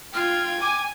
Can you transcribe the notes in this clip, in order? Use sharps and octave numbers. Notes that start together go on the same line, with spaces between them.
F4 G5 F6 G#6
G#5 D6